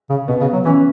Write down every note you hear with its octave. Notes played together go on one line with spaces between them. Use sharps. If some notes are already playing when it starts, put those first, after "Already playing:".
C#3
B2 B3
C#3
F#3
E3 C#4